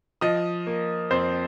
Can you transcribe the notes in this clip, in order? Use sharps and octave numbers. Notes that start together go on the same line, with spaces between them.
F3 D#5 D#6
A#3
F2 C4 C5